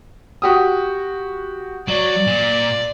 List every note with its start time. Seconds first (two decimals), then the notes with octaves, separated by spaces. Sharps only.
0.42 F#4 G4 D#6
1.88 F#3 D5 F#7
2.27 A#2